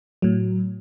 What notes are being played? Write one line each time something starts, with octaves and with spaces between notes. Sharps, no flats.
A2 F#3